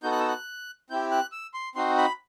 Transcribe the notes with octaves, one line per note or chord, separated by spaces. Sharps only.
B3 D#4 F#4 A4 G6
F#6
E6
F#6
C4 E4 G4 G6
F#6
E6
C6
C4 D#4 F#4 C6
B5